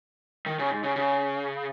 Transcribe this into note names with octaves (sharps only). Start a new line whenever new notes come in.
D#3
C#3
G#2
C#3
C#3